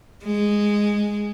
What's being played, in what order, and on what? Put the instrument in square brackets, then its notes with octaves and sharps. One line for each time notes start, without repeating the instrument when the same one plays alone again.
[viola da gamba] G#3